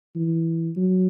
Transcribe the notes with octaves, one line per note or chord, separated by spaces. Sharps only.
E3
F#3